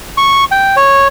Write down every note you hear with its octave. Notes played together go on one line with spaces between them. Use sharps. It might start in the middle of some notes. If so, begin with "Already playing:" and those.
C#6
G5
C#5